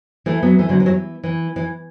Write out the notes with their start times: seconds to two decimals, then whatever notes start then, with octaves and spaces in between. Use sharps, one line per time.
0.26 E3 A3
0.43 F#3 B3
0.59 E3 A3
0.69 D3 F#3
0.80 E3
0.86 F#3
0.91 E3
1.23 E3
1.56 E3